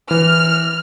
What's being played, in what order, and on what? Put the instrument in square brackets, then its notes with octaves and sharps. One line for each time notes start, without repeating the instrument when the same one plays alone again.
[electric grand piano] E3 [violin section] F6